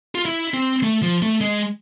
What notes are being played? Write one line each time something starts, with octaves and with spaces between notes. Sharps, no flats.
F4
E4
C4
A3
F3
A3
G#3